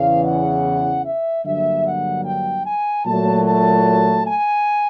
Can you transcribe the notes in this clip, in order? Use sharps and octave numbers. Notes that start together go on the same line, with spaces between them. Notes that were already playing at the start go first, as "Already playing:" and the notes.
Already playing: E2 C#3 E3 F5
F#5
E5
G2 D3 F#3 A#3 E5
F#5
G5
G#5
A#2 F#3 A3 A5
A5
G#5